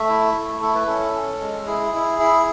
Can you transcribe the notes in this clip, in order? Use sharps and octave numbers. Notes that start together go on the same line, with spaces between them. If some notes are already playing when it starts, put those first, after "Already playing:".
Already playing: A3 E5
E4
A3
E4 A4
B4
C#4 A4
C#4
G#3
E4 G#4
E4
E4